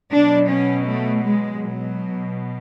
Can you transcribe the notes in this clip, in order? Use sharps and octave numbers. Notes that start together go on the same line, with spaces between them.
B2 F#3 D4
C#4
A3
G#3
B2 F#3